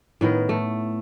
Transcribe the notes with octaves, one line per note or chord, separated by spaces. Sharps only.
A2 D#3 B3 A#4
A3